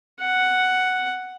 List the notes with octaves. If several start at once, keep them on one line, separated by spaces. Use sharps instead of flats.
F#5